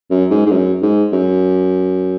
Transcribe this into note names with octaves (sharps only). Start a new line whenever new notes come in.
F#2
G#2
G#2
F#2
G#2
F#2